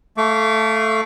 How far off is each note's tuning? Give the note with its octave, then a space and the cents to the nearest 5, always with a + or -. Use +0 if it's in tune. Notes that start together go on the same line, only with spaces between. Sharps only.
A3 +0 F5 -20 D6 -45